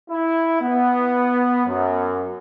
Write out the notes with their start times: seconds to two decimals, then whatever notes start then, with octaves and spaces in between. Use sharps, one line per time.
0.10 E4
0.62 B3
1.67 F#2